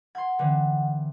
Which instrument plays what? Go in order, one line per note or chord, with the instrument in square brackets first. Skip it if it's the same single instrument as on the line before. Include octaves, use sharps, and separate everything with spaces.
[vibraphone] F#5 [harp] C6 G#6
[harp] D3 E3 C4